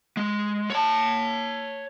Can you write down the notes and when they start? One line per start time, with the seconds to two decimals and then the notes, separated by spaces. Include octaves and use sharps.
0.17 G#3
0.70 C#5 A5